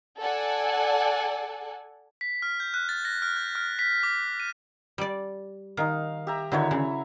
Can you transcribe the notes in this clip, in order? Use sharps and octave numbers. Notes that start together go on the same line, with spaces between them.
A4 D5 F#5 G#5
B6
F6
G6
F#6
A6
A#6
F6
G6
F6
B6
D6
D#7
G3 D5
D#3 D#4 F5
G4 E5 A#5
D3 D#3 F#3 E4 C#5
C#3